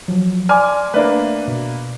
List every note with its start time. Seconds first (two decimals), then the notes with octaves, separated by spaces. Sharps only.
0.08 F3 F#3
0.49 D5 G#5 C6 D6 F6
0.94 A3 A#3 D4 B4 E5
1.47 B2